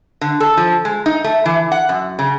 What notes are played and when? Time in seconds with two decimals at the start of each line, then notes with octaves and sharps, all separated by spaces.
0.21 D3
0.40 A4
0.57 F3
0.85 G#3
1.06 D#4
1.24 A3
1.46 E3
1.72 F#5
1.89 F#2
2.19 C#3